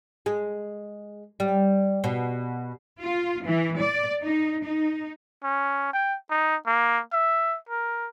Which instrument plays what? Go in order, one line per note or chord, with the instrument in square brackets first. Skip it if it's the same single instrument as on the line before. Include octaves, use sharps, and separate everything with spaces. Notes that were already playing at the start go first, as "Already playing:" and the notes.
[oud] G#3
G3
B2
[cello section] F4
E3
D5
D#4
D#4
[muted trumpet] C#4
G5
D#4
A#3
E5
A#4